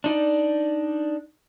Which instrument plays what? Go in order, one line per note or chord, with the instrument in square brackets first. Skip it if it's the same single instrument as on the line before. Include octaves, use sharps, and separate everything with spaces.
[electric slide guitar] D4 D#4 D5